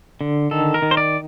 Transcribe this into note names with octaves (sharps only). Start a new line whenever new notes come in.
D3
D#3 A4
A#4
D#3
C5
D5